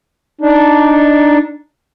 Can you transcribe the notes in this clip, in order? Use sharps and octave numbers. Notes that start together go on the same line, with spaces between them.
D4 D#4